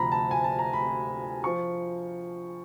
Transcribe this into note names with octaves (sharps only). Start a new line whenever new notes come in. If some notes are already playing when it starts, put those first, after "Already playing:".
Already playing: D2 C3 F3 A#5 B5
A5
G#5
A5
A#5
B5
F3 C#6